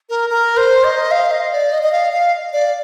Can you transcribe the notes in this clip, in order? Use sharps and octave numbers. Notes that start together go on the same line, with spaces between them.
A#4
A#4
C5
D#5
F5
D#5
D5
D#5
D#5
F5
F5
D5